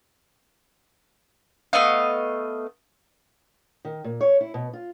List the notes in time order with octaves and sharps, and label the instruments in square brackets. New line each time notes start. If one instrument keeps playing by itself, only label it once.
[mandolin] A3 B3 D#5 F5
[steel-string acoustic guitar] D#3
A#2
C#5
E4
B2
F4